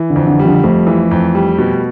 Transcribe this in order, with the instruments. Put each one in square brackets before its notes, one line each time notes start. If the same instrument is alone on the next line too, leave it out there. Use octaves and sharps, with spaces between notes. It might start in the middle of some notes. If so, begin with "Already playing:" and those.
Already playing: [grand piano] E3
[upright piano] D3
[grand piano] F2
[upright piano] D3
[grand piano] G3
[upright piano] D3 F3
[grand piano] F2 [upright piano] F3 A3
[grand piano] E3
F2
G3
B2